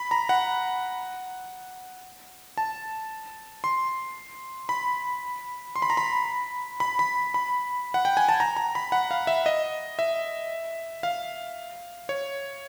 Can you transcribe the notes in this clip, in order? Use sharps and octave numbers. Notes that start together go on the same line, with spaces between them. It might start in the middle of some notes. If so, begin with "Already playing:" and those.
Already playing: B5
A#5
F#5
A5
C6
B5
C6
B5
A#5
B5
B5
B5
B5
F#5
G5
G#5
A5
A#5
A#5
B5
F#5
F5
E5
D#5
E5
F5
C#5